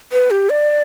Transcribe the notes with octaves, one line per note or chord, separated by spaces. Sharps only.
B4
G4
D5